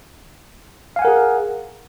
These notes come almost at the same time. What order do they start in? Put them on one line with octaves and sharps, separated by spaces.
F5 G#5 F#5 A#4 G#4